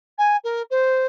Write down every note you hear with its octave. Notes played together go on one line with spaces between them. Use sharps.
G#5
A#4
C5